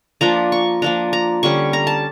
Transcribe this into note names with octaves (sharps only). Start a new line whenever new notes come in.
F3 A#3 D4 A#5
C#6
F3 A#3 D4 A#5
A#5
D3 G3 C#4 C#6
A#5
A5